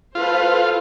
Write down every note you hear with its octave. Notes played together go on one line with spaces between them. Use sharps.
F4 A4 B4 C5